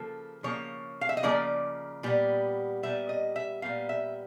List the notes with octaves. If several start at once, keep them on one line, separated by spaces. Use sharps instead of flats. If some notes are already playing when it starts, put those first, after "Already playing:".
Already playing: C#3 F3 A#3 A4
C#3 F3 A#3 C#5
F5
E5
D#5
C#3 F3 A#3 D5
A#2 G3 B3
A#2 G3 B3 E5
D#5
E5
A#2 G3 B3 F5
E5